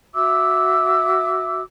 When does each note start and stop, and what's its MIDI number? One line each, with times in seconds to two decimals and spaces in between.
0.15 1.62 66
0.15 1.62 76
0.15 1.62 86
0.15 1.62 88